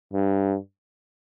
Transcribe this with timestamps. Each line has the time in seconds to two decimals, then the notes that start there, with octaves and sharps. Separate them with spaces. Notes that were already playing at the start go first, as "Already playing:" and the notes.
0.13 G2